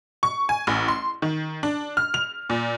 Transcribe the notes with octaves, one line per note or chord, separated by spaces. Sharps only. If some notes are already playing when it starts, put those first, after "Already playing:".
C#6
G#5
A1
C6
D#3
D4
F6
F7
A#2